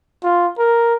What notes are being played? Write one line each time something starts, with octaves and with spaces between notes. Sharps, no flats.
F4
A#4